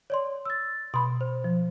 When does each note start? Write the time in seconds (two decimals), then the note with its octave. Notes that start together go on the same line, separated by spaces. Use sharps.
0.10 C#5 D5 C6
0.45 E6 A6
0.94 B2 B5 C6
1.21 C5
1.44 F3